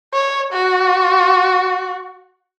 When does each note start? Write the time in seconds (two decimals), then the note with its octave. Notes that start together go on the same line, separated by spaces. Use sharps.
0.13 C#5
0.53 F#4